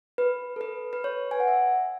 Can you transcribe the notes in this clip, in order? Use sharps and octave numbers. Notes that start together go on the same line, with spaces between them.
B4
A4
B4
B4
C#5
G#5
F#5
E5